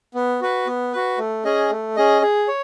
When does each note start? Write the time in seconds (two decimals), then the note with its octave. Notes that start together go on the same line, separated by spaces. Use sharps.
0.14 B3
0.41 F#4 B4
0.67 B3
0.93 F#4 B4
1.18 A3
1.45 C#4 G#4 D#5
1.70 A3
1.96 C#4 G#4 D#5
2.22 G#4
2.48 C#5